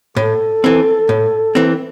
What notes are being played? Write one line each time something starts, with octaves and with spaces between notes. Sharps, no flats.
A2 A4
E3 C4
A2
E3 C4